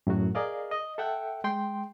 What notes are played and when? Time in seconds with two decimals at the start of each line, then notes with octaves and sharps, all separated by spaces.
0.07 F#2 A2 F#3 F#4
0.35 G#4 A#4 D5 D#5 F5
0.71 D#5
0.98 A4 E5 F#5 G5
1.44 G#3 G5 C6